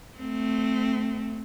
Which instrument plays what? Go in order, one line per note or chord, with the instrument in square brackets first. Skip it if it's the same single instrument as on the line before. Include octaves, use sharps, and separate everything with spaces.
[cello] A3 C4